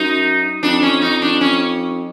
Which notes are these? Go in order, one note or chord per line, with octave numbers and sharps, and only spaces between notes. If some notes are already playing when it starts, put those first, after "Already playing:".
Already playing: F#2 D#4
F2 D4
C#4
D#4
D4
C#4